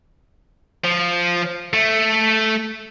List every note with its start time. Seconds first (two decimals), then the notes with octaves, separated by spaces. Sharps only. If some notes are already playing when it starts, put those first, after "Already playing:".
0.84 F3
1.74 A3